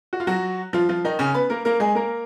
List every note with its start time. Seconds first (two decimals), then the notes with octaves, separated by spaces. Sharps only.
0.13 F#4
0.20 F4
0.27 F#3 F#4
0.73 F3 F4
0.89 F3 F4
1.04 D#3 D#4
1.19 C#3 C#4
1.34 B3 B4
1.50 A#3 A#4
1.65 A#3 A#4
1.80 G#3 G#4
1.95 A#3 A#4